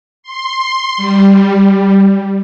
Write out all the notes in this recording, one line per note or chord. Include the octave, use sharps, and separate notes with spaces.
C6
G3